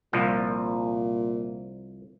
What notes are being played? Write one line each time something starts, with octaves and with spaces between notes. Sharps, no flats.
C2 A#2 F3